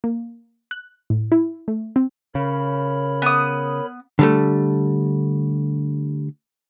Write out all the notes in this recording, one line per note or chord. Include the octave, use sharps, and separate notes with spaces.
A#3
F#6
A2
E4
A3
C4
C#3 A#4 C#5 B5
B3 D#6
D3 G3 A3